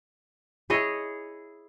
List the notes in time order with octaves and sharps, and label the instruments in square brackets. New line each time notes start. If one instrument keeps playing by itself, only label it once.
[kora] E4 G#4 C#5 D#5